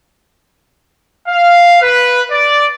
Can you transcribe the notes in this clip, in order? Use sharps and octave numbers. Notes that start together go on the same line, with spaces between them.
F5
B4
D5